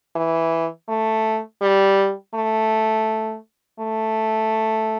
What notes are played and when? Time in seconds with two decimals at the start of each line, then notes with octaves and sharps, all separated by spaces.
0.16 E3
0.88 A3
1.62 G3
2.34 A3
3.80 A3